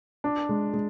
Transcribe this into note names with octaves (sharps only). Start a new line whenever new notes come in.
D4
G#3
G#3